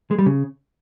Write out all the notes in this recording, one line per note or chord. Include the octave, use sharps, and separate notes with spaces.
G#3
G3
C#3